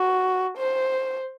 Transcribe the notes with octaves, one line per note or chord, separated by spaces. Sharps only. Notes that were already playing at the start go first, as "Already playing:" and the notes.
Already playing: F#4
C5